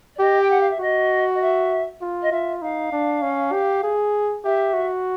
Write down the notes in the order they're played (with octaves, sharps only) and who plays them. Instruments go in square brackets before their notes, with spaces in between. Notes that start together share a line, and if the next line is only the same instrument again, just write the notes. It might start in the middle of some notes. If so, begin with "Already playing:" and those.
[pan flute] D5
[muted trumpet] G4 [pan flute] D#5
[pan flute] G5
F#5
F5
E5
[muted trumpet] F#4 [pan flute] D#5
[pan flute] D#5
E5
[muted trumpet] F4
[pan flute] D#5
[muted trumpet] F4 [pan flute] E5
[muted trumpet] D#4 [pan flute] F5
[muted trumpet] D4
C#4
G4
G#4
[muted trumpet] G4 [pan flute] E5
[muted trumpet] F#4